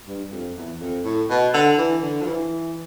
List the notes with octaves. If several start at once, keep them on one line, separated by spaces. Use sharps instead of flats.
G2
F2
E2
F2
A2
B2
D3
E3
D3
F3
E3